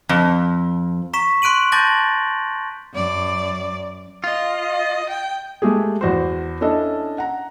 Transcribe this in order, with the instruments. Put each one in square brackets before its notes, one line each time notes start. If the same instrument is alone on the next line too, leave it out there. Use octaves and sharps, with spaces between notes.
[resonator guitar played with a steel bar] F2
[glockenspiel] A#5 C#6 B6 E7
C6 F#6 D7 D#7 F#7
A5 D6 G6 A6 A#6 F#7
[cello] F#2 D5
[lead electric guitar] F4 [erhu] D#5
[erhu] G5
[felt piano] G#3 A3 G4 G#4
E2 F#4 C5
C#4 D4 E4 A4 D#5
F#5 A#5